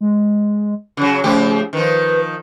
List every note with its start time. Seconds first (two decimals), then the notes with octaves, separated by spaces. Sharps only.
0.01 G#3
0.97 C#3 F#3
1.24 C#3 F3 A3 G4
1.73 D#3 F3 B4